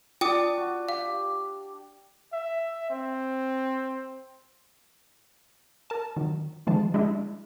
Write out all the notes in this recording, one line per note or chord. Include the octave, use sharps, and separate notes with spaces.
D4 F4 G5 D6 D#6
F#4
G4 F5
E5
C4
A#4 A5
D#3 F#3
D3 D#3 F3 G#3 A5
G#3 D4 E4